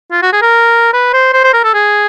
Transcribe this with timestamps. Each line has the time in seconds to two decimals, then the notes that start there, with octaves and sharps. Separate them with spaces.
0.12 F4
0.22 F#4
0.33 G#4
0.42 A#4
0.93 B4
1.14 C5
1.34 C5
1.44 C5
1.54 A#4
1.64 A4
1.74 G#4